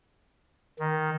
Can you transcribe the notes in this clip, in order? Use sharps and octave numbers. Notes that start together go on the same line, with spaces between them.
D#3